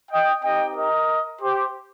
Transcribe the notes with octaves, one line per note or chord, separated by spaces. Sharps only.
D#5 G5
C4 D#4 G4 D#5 G5
A#4 D#5
G4 C5